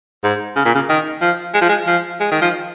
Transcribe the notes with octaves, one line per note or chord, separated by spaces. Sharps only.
G#2
C#3
A#2
C#3
D#3
F3
G#3
F3
G#3
F3
G#3
D#3
F3